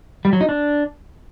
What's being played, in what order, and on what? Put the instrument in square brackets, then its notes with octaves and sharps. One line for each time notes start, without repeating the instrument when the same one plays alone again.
[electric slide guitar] G3
F#3
D#4
D4